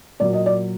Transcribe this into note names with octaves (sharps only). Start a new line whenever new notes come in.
A#2 F#3 D5
D#5
D5